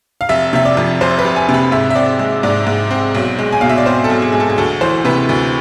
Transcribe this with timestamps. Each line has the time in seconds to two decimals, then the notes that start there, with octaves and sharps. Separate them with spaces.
0.21 F5
0.29 F1 E5
0.53 C3 E5
0.65 D5
0.77 F2
1.01 F1 C5
1.19 B4
1.25 F1
1.36 G#5
1.49 C3
1.54 B5
1.72 G#2 E5
1.91 E5
1.95 C4 D5
2.19 G#3
2.43 G#2 D5
2.67 G#2
2.91 C4
3.15 B1
3.39 G#3
3.52 G#5
3.61 B2 F5
3.69 E5
3.78 D5
3.86 C4 C5
4.04 A4
4.10 B1
4.22 G#4
4.32 G#3 G#4
4.40 A4
4.50 G#4
4.58 D2 A4
4.81 E3 C5
5.05 C3 B4
5.29 D2